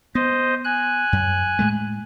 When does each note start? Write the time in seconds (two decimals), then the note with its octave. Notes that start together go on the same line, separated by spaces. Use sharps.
0.15 B3 C5 D#5
0.65 G#5 F#6
1.13 F#2
1.59 A2 G#3 A3